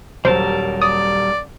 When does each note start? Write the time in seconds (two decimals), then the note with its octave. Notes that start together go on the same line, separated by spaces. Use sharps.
0.25 D#1 F#3 G3 A#4 C5 A5
0.82 D5 D#6